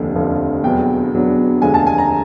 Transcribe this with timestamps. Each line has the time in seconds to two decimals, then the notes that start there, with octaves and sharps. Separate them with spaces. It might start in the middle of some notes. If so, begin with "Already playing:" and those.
Already playing: F1 D#2 D3 F3
0.15 F1 D#2 D3 F3
0.64 E2 B2 F#3 B3 D4 G5
1.13 E2 B2 F#3 B3 D4
1.62 F1 D#2 D3 F3 G#3 G#5
1.74 A5
1.87 G#5
1.98 A#5